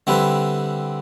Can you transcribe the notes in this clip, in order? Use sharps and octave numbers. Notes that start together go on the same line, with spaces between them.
D3 G3 C4 E4 B4